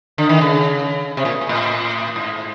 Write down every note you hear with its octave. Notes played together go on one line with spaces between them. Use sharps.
D3
D#3
C#3
C3
A#2
A#2
A2
G#2